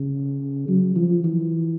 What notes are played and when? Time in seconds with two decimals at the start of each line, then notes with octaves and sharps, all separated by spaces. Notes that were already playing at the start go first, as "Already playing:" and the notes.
Already playing: C#3
0.68 F#3
0.96 F3
1.24 E3